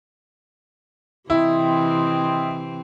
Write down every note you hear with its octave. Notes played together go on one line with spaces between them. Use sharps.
C3 E3 C4 E4 D#5 G5 C6